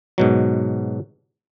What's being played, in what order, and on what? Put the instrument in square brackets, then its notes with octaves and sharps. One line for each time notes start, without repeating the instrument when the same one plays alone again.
[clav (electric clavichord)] G#2 B2 F#3